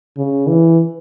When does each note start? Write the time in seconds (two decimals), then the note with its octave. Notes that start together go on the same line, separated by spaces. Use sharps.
0.18 C#3
0.47 E3